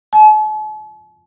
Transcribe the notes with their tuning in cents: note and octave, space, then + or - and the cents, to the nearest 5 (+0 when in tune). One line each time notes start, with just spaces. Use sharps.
A5 -45